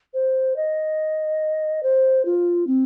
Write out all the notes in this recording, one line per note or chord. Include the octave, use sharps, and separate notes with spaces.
C5
D#5
C5
F4
C4